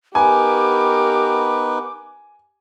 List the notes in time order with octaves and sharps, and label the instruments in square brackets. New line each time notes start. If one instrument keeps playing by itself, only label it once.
[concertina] B3 D#4 B4 [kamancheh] G4 A#4 [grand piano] G#5 [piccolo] D6